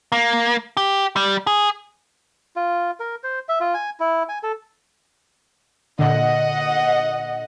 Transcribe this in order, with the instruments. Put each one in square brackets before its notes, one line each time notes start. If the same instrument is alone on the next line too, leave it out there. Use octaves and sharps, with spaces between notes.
[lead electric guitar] A#3
G4
G3
G#4
[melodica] F4
A#4
C5
E5
F4
G#5
E4
G#5
A4
[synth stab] A#2 D3 [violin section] D#5 F#5